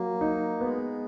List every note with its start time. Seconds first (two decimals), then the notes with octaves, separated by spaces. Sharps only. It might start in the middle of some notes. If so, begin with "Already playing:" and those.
Already playing: F#3 A#3
0.21 D#4
0.61 G#3 B3